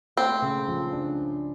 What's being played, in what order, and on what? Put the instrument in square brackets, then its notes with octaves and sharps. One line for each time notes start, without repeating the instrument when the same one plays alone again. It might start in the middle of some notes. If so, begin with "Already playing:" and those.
[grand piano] A3 [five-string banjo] C4
[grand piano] C#3
F3
D4